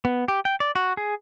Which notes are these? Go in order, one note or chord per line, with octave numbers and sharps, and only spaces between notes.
B3
G4
G5
D5
F#4
G#4